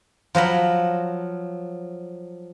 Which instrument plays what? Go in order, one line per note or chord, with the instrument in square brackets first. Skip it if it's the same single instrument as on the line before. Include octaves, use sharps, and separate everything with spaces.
[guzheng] F3 F#3 A#5 B5